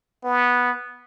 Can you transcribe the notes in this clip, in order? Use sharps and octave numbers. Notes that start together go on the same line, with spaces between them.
B3